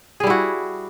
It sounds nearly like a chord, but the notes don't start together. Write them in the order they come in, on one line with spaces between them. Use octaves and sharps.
G#4 G3 E4 F#4